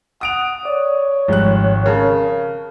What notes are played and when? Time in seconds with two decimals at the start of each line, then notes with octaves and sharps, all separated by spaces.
0.21 F#5 D#6 D7 F7
0.65 C#5 D5
1.28 G#1 F3 G3 G#3 F#6
1.86 C#3 A#4 A5